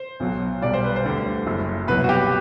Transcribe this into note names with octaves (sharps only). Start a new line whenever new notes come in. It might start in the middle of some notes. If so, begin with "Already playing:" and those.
Already playing: C5
B1 B2 F#3
B1 B2 G3 D5
C5
B4
C5
D2 D3 G3
F#1 F#2 F#3
C2 B2 F#3 B4
F#4
G4